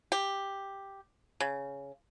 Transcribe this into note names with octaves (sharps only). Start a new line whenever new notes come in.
G4
C#3